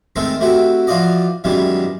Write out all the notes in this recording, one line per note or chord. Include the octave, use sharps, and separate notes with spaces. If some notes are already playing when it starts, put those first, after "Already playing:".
D#3 G#3 A3 C4 A4 A#4
A3 C4 E4 F#4 G4
E3 F3 F4 F#4 D5 D#5
F#2 B2 D#3 E3 G3 G#3